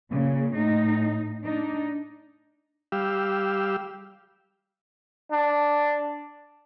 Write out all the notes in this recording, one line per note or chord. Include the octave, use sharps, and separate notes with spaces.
A#2 C#3
A2 D#4
D4 D#4
G3 G4 F5 E6
D4